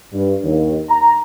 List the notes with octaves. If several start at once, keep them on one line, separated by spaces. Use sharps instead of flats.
G2
D#2
A#5